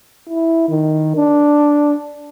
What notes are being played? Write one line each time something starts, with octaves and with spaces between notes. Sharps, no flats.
E4
D#3
D4